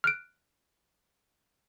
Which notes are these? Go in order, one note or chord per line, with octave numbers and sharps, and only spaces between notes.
F6 F#6 D7